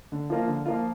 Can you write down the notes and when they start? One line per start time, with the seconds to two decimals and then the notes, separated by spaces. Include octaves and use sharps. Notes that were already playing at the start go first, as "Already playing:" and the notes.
0.12 D3
0.30 F3 A#3 F4
0.48 D3
0.66 F3 A#3 F4